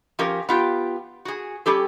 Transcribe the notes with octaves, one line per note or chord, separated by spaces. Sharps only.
F3 C#4 G4 A#4
B3 F4 G4
F#4 G#4
G3 C#4 G4 A4